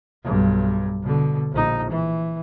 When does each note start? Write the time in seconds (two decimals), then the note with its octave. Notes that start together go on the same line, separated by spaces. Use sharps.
0.24 B1 G2
1.03 B2 D3
1.52 A#1 D#4
1.90 E3